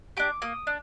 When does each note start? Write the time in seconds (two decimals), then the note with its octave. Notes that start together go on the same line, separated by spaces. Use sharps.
0.17 D4 G4 D6
0.42 A#3 D#6
0.67 D4